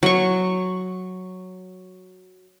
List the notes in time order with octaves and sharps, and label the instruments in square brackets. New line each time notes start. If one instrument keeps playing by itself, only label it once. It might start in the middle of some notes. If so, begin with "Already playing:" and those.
[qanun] F#3 C#6